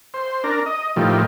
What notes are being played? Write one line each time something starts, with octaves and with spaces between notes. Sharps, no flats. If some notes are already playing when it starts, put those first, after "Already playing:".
C5
D4 A#4
D#5
A2 D#3 F3 G3